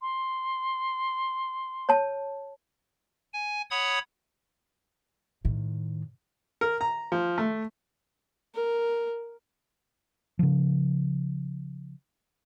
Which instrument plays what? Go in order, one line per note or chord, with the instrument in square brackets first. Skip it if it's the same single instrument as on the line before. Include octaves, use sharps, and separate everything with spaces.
[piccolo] C6
[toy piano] C#5 A5
[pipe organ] G#5
C#5 F#5 B5 D#6 G#6
[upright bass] A2 D#3
[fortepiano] A#4
A#5
F3
A3
[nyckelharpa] A#4
[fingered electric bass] C#3 F3